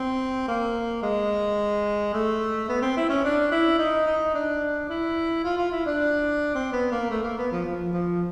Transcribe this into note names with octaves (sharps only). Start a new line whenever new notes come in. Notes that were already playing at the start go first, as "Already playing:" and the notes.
Already playing: C4
A#3
G#3
A3
B3
C4
E4
C#4
D4
E4
D#4
D#4
D4
E4
F4
F4
E4
D4
C4
B3
A#3
A3
A#3
B3
F3
F3
F3